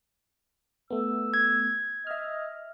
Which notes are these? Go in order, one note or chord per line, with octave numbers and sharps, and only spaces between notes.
A3 B3 E6
G#6
D#5 E5 F6